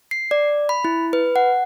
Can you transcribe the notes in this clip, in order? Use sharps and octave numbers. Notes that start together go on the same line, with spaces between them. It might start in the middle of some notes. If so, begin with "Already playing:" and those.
C7
D5
B5
E4
B4
F#5